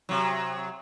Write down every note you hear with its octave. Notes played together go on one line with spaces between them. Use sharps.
C3 F#3